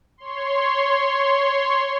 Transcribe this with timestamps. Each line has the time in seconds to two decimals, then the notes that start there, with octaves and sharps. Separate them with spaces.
0.18 C#5 C6